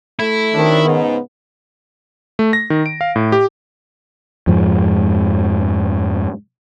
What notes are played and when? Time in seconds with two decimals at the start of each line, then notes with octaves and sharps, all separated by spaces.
0.19 A3 E4
0.53 C3 D#3 F#3 D4
0.85 G#2 C#3 B3 D#4
2.39 A3
2.53 A#6
2.70 D#3
2.86 D7
3.01 F5
3.16 A2
3.32 G4
4.47 F2 G#2 F3 G#3